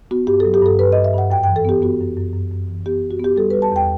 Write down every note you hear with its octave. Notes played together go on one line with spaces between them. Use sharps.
B3 F#4
G2 G4
A4
F#3
G4
G2 A4
G2 B4
G2 D#5
E5
G2 F#5
F#2 G5
G5
E3
A4
B3 G4
B3 F#4
F#2
F#2
F#2
F#2
E3
B3 G4
F#2
F#4
B3 G4
G3 A4
G3 B4
A5
E2 G5